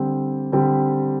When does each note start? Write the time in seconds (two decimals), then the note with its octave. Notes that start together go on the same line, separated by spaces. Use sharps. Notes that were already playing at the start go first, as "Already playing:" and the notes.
Already playing: D3 G3 C4 G4
0.52 D3 G3 C4 G4